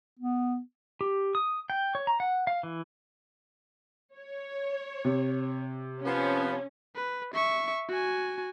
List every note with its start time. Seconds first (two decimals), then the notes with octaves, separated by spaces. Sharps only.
0.19 B3
1.01 G4
1.35 D#6
1.70 G5
1.95 C#5
2.07 A#5
2.20 F#5
2.47 F5
2.63 E3
4.16 C#5
5.05 C3
6.05 F3 B3 C#4
6.96 B4
7.34 E5 C#6
7.89 F#4 G#5